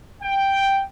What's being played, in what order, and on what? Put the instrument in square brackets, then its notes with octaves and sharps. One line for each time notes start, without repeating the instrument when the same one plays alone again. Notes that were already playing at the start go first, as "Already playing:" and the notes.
[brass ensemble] G5